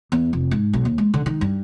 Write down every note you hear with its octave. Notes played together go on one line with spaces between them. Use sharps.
E2
F1
G#2
B1
D#2
G#3
D3
D#3
G2